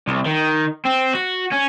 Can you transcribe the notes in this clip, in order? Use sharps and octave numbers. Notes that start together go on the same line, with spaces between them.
C2
D#3
C4
F#4
C#4